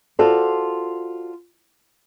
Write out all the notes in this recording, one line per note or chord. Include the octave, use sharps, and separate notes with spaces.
F4 F#4 A4 C5 D5